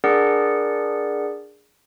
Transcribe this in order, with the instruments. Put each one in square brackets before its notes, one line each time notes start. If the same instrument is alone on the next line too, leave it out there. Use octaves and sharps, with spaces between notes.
[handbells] D4 G#4 A#4 D5 F#5